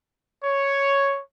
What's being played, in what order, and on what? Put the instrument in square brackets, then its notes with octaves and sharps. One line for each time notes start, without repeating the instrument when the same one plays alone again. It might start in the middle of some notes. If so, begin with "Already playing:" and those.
[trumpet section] C#5